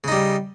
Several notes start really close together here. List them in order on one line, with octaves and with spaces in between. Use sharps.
C#3 D#4 G3